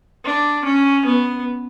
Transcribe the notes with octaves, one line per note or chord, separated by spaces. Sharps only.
D4
C#4
B3